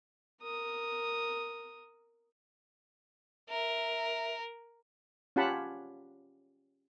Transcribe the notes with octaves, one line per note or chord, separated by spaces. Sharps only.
A#4 D#6
A#4 E5
C#4 F4 G4 F#5 A5 B5